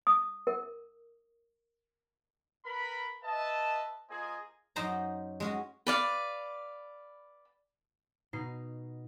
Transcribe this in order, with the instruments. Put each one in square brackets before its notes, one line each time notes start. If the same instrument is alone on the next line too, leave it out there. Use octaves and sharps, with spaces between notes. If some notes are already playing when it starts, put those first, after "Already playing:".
[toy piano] D#6
A#4
[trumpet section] A#4 B4 B5
B4 D#5 E5 A5
A#3 F4 G#4 C5 D#5 G#5
[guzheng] F#2 C#4 D#4 C5 F#5 A#5
G#3 C#4 F#4
[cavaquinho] B4 D5 F5
[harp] B2 D#4 C7